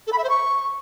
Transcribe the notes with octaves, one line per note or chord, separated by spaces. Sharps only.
A4
B5
E5
C5
C#6